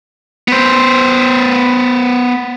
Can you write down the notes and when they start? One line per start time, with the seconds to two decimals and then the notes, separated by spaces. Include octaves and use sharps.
0.48 B3 C5